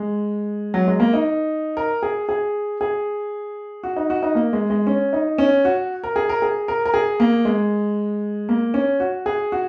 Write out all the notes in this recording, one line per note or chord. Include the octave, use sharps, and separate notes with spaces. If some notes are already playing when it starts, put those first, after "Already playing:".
Already playing: G#3
F#3
G#3
A#3
D#4
A#4
G#4
G#4
G#4
F#4
D#4
F#4
D#4
A#3
G#3
G#3
C#4
D#4
C#4
F#4
A#4
G#4
A#4
G#4
A#4
A#4
G#4
A#3
G#3
A#3
C#4
F#4
G#4
F#4